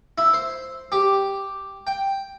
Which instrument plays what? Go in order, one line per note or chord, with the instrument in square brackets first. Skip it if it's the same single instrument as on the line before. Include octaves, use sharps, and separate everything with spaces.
[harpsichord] E4
C5
G4
G5